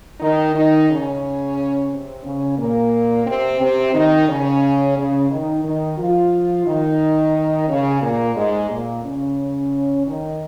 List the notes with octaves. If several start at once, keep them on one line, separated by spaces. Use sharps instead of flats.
D#3 D#4
D#3 D#4
C#3 C#4
C3 C4
C#3 C#4
A#2 A#3
C3 C4
C3 C4
D#3 D#4
C#3 C#4
C#3 C#4
D#3 D#4
D#3 D#4
F3 F4
D#3 D#4
C#3 C#4
A#2 A#3
G#2 G#3
A#2 A#3
C#3 C#4
D#3 D#4